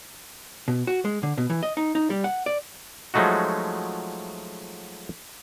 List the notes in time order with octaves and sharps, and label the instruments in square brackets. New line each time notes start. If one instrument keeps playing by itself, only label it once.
[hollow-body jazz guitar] B2
F#4
G#3
D3
B2
E3
D#5
D#4
D#4
G3
F#5
D5
[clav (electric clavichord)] F3 F#3 G#3 A3 D#4 F#4